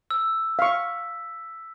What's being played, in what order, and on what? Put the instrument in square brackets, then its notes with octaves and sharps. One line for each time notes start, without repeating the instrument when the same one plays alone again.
[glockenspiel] E6
[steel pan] F5 C#6 [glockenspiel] B6